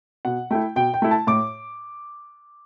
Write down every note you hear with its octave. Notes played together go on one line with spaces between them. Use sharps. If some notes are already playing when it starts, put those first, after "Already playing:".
B2 F#5
A3 E4 G5
B2 G5
G5
A3 E4
A5
A2 D6